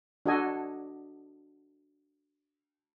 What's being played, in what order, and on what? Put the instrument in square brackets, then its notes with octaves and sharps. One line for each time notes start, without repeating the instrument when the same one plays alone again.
[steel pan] D4 F#4 A4 D#5 G#5